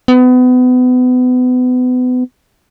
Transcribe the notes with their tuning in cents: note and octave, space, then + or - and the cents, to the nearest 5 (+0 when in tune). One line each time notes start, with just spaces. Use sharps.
B3 +30